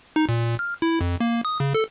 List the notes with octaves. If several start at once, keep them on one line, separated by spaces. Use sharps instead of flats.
D#4
A#2
F6
E4
F2
A#3
D#6
C#3
A4